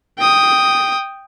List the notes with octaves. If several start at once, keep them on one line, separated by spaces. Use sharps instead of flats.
G5 D#6